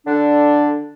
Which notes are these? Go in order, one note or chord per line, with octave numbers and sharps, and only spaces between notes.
D3 D4